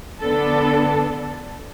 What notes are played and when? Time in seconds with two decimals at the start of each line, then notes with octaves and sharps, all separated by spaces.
0.22 D3 B3 D4 A4